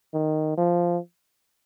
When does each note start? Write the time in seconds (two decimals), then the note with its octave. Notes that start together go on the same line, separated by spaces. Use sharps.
0.14 D#3
0.58 F3